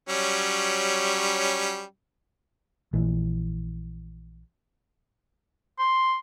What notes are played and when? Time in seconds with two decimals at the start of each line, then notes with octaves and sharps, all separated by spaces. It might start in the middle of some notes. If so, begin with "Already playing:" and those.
0.09 F#3 G3 C#4
2.93 A#1 E3
5.79 C6